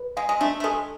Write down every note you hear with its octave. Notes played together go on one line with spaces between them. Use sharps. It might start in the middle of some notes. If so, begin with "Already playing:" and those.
Already playing: B4
G#3 F5
G#3
A3 D4
A3
G#3 A4